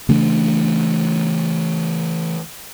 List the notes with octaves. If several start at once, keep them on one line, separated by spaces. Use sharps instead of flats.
C#3 E3 A3 D4